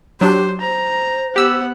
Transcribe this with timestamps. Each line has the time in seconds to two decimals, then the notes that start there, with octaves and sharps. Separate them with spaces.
0.21 F#3 D4 G4 C5
0.60 C5 A#5
1.36 B3 G4 F#5 E6